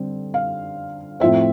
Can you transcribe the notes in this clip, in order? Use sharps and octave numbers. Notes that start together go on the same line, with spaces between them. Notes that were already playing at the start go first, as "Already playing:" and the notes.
Already playing: D3 G3 C4
F5
A2 F3 C4 E5